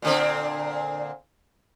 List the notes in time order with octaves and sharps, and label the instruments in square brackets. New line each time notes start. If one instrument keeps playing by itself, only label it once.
[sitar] A#2 D3 C4